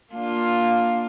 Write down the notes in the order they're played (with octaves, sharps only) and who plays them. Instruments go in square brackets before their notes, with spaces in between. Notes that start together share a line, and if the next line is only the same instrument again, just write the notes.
[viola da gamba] A#3 D4 F4